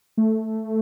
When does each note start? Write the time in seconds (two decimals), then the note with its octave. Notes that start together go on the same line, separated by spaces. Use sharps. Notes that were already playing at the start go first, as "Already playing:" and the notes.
0.17 A3